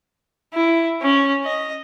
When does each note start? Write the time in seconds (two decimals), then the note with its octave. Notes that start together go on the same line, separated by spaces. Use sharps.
0.54 E4
1.02 C#4
1.44 D#5